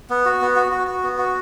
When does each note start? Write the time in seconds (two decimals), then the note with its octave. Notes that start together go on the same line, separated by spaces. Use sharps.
0.10 B3
0.25 F#4
0.41 B3
0.56 F#4
0.72 F#4
0.87 F#4
1.03 B3
1.18 F#4